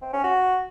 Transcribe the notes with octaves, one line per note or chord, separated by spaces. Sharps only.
C4
C#4
F#4